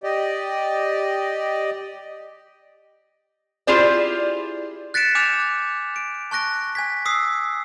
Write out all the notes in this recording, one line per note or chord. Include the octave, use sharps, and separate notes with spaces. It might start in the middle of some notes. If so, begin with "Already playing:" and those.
G4 D5 D#5
E4 F4 G4 G#4 C5 D5
F#6 A6 B6 C#7 D7 E7
G#5 D6 F6 G6 E7 F7
D7
A5 C#6 F#6 A#6 D7
G#5 G#6 B6
D#6 E6 B6 C7